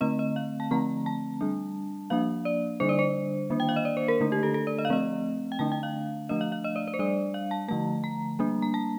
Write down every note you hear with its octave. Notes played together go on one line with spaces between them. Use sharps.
D3 A3 C4 D#5
D#5
F5
A5
D3 F3 A3 C4 A#5
A5
G3 D4
F3 A#3 D4 F5
D5
D3 G3 D4 C5
D5
C5
D#3 A#3 D4
G5
F5
D#5
D5
C5
A#4
D3 A3 D4
G4
A4
A4
D5
D#5
F5
F3 A3 C4 D#5
G5
D3 A3 D4 A5
G5
F5
F3 A3 D4 D#5
F5
F5
D#5
D5
D5
C5
G3 D4 D5
F5
A5
D3 F3 A3 A5
A#5
G3 A#3 D4
A#5
A5